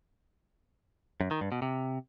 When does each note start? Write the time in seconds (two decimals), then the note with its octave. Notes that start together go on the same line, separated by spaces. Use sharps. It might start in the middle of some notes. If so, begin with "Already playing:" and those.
1.21 F#2
1.31 D#3
1.41 G2
1.52 B2
1.62 C3